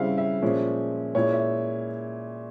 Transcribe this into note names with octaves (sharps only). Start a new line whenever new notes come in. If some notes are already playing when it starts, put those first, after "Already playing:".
Already playing: C#3 G3 C4 E4 E5 F5
E5
A#2 F3 G#3 C#4
A#2 G#3 E4 C#5
E5